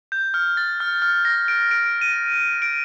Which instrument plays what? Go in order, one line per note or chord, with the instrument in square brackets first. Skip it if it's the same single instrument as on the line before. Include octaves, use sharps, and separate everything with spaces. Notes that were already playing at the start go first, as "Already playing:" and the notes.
[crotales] G6
F6
A6
F6
F6
A#6
D7
D7
D7
D#7
D7